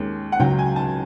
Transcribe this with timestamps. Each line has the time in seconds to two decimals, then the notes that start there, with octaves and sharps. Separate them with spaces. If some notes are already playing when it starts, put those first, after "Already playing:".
Already playing: D#2 D#3 G#3 C#4
0.32 F#5
0.39 C#2 C#3 F#3 G5
0.59 G#5
0.76 A5